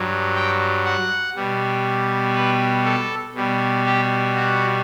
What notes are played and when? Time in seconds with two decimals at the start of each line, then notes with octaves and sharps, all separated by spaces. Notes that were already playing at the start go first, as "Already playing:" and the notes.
Already playing: G2 F#3
0.35 G5
0.85 F#5
1.36 B2 G3
2.35 B4
2.85 A4
3.35 B2 G3
3.85 G4
4.35 F#4